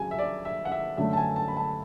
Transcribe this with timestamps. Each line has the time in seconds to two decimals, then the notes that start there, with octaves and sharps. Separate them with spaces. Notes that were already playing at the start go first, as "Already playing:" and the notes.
Already playing: C#3 F#3 G#5
0.11 E5
0.19 D5
0.45 E5
0.65 F#5
0.72 E5
0.97 F#2 D3 A3 E5
1.13 A5
1.17 G#5
1.36 A5
1.48 B5
1.57 A5